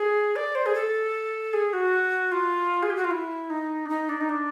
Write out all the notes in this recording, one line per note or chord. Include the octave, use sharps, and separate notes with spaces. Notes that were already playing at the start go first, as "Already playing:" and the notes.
Already playing: G#4
D5
C5
G#4
A4
G#4
F#4
F4
G#4
G4
F#4
F4
E4
D#4
D4
D#4
D4
D#4
D4